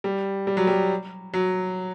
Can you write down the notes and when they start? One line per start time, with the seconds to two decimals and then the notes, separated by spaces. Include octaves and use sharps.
0.04 G3
0.47 G3
0.57 F#3
0.67 G3
1.34 F#3